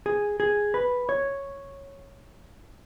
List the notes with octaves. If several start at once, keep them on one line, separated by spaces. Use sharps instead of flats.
G#4
G#4
B4
C#5